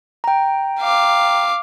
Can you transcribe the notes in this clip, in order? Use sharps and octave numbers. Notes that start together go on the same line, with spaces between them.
G5 A#5
F5 D6